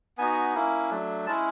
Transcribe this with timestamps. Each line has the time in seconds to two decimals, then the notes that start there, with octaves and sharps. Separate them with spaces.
0.18 B3 D#4 F#4 G#5
0.54 A#3 C#4 E4
0.90 F#3 A3 D4
1.26 G#3 C#4 E4 A5